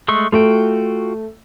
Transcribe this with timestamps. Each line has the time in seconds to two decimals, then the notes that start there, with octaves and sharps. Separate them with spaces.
0.08 G#3 A3 C#6
0.32 A3 F4 F#4 G5